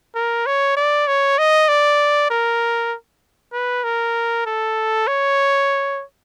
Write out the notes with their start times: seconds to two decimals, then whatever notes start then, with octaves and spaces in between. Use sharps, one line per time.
0.15 A#4
0.46 C#5
0.77 D5
1.07 C#5
1.38 D#5
1.68 D5
2.30 A#4
3.53 B4
3.84 A#4
4.46 A4
5.07 C#5